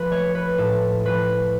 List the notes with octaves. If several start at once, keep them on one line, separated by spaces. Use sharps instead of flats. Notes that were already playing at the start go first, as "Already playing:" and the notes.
Already playing: F3 B4
A3 C#5
B4
A2 A4
F3 B4